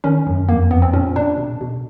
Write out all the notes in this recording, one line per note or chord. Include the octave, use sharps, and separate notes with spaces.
D#3 C#4
F#2
F2 A#3
F2 B3
C4
A#2 C#4
A#2 D4
B2
B2